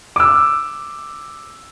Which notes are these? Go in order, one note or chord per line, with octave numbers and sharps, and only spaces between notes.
D6 E6